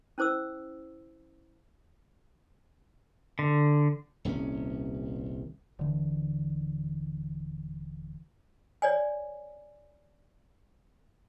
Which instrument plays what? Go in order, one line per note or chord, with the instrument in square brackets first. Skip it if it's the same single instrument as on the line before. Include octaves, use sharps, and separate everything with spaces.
[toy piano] C#4 E4 C5 D6 E6
[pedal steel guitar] D3
[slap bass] D#1 C2 C4 C#4
[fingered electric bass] D#1 D3 E3
[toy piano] C#5 D5 G#5